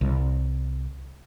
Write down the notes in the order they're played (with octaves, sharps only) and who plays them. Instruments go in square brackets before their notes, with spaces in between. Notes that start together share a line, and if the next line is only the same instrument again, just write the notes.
[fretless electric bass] C2